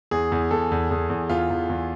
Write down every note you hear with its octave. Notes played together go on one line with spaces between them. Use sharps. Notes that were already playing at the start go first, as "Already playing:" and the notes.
E2 G#4
E2
E2 A4
E2
E2 G#4
E2
E2 F4
E2
E2